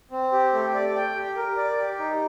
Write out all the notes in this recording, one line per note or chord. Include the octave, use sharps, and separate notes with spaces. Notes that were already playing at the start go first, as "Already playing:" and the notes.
C4
G4
A3
D5
G5
G4
A#4
D5
G4
D#4